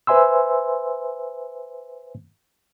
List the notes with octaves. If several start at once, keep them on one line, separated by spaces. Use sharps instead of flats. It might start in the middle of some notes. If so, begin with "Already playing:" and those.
B4 C5 E5 G#5 C6 E6